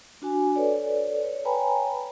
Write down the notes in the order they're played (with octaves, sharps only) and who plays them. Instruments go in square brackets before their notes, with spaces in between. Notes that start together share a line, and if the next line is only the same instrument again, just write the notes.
[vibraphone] D4 F#4 G#5
A4 B4 C#5 D5
C#5
B4 C#5 G5 G#5 A#5 B5